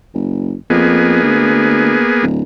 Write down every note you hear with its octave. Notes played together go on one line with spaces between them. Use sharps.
F#1
F2 A#3 B3 G#4
D2
D1